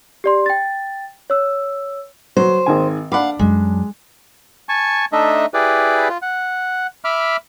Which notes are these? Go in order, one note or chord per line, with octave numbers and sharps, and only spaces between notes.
G4 D5 C6
G5 A6
C#5 E6
F#3 C5
G#1 D#3 G#5
D4 F5 F#5 B5 D6
F#2 F#3 G#3
G#5 A5 C#6
A3 D4 D#4 D#5 E5
E4 G4 G#4 B4 D5
F4
F#5
E5 B5 D6 F6